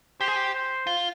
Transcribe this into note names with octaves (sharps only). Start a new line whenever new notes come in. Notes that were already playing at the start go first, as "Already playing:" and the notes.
G4 C5
G#4
G4
C5
F4